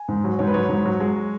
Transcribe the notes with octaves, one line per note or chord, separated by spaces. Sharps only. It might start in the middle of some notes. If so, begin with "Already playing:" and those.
Already playing: G#5
G#2
F#3
G#2 C#5
B4
F#3 C#5
G#2
F#3
G#3